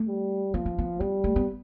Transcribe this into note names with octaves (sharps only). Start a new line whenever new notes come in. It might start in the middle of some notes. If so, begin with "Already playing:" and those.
Already playing: A3
G3
F3 B3
C4
B3
G3 B3
A3
B3